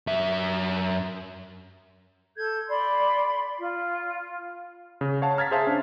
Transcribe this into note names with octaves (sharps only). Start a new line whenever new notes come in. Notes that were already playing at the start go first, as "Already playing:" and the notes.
F#2 E5
A4 G6 G#6
D5 B5 C6
F4
C#3
C#5 F5 F#5 A5
A#5 F6 G#6 A6 B6
G#4 C5 E5 F5 A5
C#4 D4